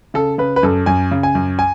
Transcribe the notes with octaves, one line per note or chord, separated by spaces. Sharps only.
C#3 A4
C#3 B4
B4
F#2 A4
F#2 G#5
C#3
G#5
F#2
G#5